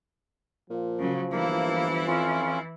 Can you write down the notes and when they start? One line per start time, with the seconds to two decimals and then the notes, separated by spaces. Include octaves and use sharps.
0.70 A#2 F3
0.99 C#3 F#3
1.32 G1 E3 A#3 E4
2.08 F2 C#4 F4